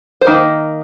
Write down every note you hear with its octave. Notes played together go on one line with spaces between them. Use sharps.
C5
D#3 A#3 D#4